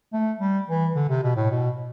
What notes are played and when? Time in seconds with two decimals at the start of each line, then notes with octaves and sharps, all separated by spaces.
0.13 A3
0.40 G3
0.68 E3
0.95 D3
1.10 C3
1.23 B2
1.36 A2
1.51 B2